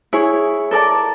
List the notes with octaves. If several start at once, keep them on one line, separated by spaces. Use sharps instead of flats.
E4 G#4 C#5
A4 A#4 D5 A5